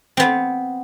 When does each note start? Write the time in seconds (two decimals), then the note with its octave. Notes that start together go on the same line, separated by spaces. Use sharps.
0.17 B3 C4